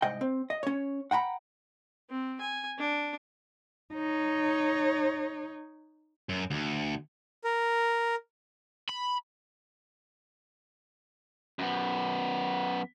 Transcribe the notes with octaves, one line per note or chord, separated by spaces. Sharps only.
C2 G#2 D#5 G5
C4
D#5
C#4 C#5
F#5 G5 A#5 B5
C4
G#5
D4
D#4 C#5
F#2
D2
A#4
B5
F#2 B3